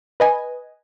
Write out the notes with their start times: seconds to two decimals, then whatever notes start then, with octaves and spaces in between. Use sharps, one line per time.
0.20 B4 D#5 G#5